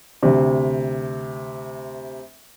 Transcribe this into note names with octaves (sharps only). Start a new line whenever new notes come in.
D2 C3